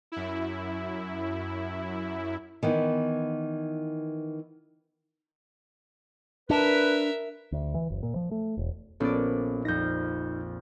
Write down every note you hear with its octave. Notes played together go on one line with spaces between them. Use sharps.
F#2 E4
D#3 E3 B3
D4 A#4 B4 E5
D2
E3
F#1
A#2
F3
A3
E1
A#1 B3 C#4 A4 D5
F2 D#4 G6 A#6